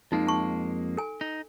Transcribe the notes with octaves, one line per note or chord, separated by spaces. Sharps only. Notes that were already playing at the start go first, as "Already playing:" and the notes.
F2 G#3 A#3 D#4
A5 C#6
A4 G#5
D#4